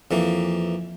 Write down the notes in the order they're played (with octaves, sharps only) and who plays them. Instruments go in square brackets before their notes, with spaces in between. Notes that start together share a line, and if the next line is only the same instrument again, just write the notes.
[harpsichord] F2 E3 A#3